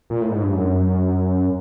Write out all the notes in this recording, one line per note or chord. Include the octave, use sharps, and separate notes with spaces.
A#2
A2
G#2
G2
F#2